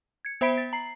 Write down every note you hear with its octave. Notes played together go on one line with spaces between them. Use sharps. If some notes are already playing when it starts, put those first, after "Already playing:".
G#6 C#7
B3 C5 E5 B5 B6 D7
A6
A#5 C7